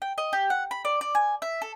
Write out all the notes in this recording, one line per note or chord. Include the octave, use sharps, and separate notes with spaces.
G5
D#5
G4
F#5
B5
D5
D5
G#5
E5
A4